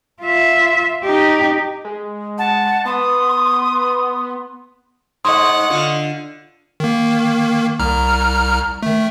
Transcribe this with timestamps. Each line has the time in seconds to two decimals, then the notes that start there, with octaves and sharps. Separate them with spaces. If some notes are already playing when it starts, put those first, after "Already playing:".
0.21 F4 E5
1.04 D#4 G4
1.85 G#3
2.38 F#5 A5
2.85 B3 C6 D#6
5.25 G#2 D#5 F#5 C6 C#6 D#6
5.70 D3 F4
6.80 D#3 A#3
7.79 C2 A#5 F6
8.83 D#3 A3